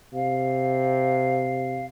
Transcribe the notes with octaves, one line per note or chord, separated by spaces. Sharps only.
C3 F5